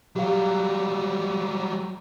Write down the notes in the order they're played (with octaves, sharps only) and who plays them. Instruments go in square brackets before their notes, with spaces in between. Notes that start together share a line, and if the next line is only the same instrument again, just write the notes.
[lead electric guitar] F#3 G3 [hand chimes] G4 F5